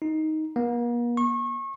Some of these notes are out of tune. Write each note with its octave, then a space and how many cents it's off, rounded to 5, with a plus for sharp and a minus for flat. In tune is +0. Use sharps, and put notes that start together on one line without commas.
D#4 +10
A#3 +45
C#6 -30